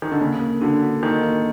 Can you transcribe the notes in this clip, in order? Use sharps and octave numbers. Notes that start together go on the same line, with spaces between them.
D#3
D3
C#3 A#3
A#3
D3 F#4
D4
D#3 A#3
A#3